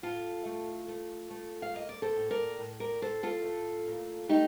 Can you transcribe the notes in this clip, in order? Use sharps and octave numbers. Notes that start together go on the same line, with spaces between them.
A2 F4 A4
A3
A3
A3
F5
A#3 D#5
D5
A4 C5
A2
A#4 D5
A2
A#4 D5
A2 A4 C5
F4 A4
A3
A#2
A3 D#4 G4